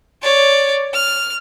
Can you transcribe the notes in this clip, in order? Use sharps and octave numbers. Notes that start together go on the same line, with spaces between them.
C#5 D5
F6